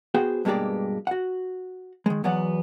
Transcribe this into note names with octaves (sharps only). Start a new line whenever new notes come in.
B3 F#4 G#4 C5 G5
G2 B2 G#3 A#3 G4 D5
F#4 F#5
D#3 G#3
E2 F#3 B3 D5 F#5